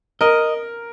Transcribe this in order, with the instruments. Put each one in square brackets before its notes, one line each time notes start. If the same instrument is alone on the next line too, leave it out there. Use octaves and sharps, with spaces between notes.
[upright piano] A#4 [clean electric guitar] D#5